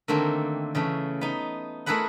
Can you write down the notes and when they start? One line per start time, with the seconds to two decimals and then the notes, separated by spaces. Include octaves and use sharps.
0.08 D3 D#3 A3 A#3 C4
0.75 C#3 E3 A3
1.21 B3 D#4
1.86 A3 E4 G#4 A#4 B4 F#5